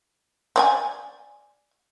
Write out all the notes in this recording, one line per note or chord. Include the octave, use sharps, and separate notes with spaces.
C4 D5 G#5